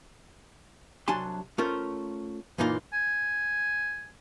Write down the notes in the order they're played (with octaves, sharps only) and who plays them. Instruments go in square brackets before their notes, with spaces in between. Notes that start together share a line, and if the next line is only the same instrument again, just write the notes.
[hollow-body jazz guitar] C2 F#3 D4 G#5 A5 C6
A3 C#4 F4 A#4 C5
F#2 A#2 E3 A#3 D#4 F4
[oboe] G#5